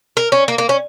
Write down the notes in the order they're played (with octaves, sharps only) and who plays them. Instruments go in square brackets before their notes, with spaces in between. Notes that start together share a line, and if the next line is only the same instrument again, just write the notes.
[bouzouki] A#4
C#4
A#3
A#3
C#4